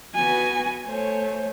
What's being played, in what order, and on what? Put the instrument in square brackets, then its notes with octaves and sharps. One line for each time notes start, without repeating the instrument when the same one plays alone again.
[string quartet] B3 F#4 B4 [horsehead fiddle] G#5
[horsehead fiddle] A3 [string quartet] C5 C#5 G#5